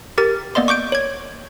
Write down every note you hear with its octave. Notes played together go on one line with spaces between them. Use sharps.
G4 A#4 A6
A#3 B3 D5 D#5 C6
C#6 D6 G6 D7
C#5 G#6